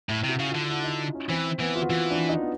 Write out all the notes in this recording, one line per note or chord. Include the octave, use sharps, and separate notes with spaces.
A2 E4
C3
F#4
C#3
F4
D3
E4
D#4
C#4
E3 C4
E3 B3
F4
F#4
E3 F4
D4
D#4
B3